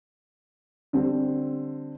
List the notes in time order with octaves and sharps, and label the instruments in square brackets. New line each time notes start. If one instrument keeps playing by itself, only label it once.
[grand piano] D3 G3 C4